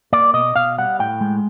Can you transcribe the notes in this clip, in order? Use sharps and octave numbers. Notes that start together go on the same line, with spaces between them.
A#3 D5
B2 D#5
B2 F5
G3 F#5
A2 G5
G#3